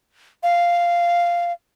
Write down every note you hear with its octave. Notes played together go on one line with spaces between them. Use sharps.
F5